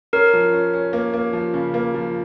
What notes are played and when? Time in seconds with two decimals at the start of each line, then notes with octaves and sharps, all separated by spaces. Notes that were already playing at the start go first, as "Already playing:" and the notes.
0.13 C#4 A#4
0.33 F3
0.53 C#4
0.74 C#4
0.93 A#3
1.13 A#3
1.33 F3
1.54 C#3
1.74 A#3
1.94 F3